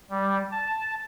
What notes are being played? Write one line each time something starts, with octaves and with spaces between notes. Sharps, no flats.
G3
A5